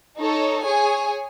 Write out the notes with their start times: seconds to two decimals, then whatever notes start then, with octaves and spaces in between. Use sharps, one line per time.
0.18 D#4 A4 C#5
0.65 G#4 C#5 G#5